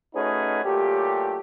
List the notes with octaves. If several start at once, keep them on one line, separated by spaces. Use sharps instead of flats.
A3 C#4 D#4 F#4 G#4 B4
A#2 F#3 A3 G4